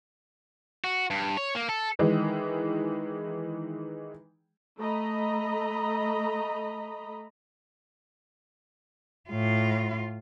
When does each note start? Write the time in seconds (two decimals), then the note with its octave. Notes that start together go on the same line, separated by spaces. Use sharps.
0.84 F#4
1.10 G2
1.37 C#5
1.55 A#3
1.69 A4
1.99 D#3 E3 G#3
4.79 A3 D#5 A#5 B5
9.29 A2 F4